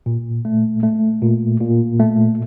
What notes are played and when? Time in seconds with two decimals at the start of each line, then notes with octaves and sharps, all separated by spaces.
0.06 A#2
0.45 A3
0.83 A3
1.22 A#2
1.60 A#2
2.00 A3